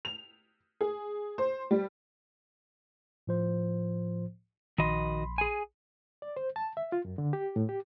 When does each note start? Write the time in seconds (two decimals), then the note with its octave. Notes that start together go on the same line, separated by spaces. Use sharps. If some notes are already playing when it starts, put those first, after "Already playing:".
0.05 F7
0.81 G#4
1.38 C5
1.71 G3
3.27 A2 F3 C5
4.78 A#1 D#3 F#4 D#5 B5 C6
5.38 G#4 G#5
6.22 D5
6.37 C5
6.56 A5
6.77 E5
6.92 F4
7.05 F#2
7.18 D3
7.33 G4
7.56 A2
7.69 G4